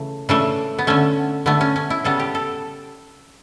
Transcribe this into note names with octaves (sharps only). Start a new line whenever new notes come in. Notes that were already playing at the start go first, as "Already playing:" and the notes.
Already playing: C#3 E3 A3
C#3 E3 A3 D4
B3
D3 A3 C#4
D3 A3 B3
C#4
C#4
E4
C#3 G3 B3 A4
G4
A4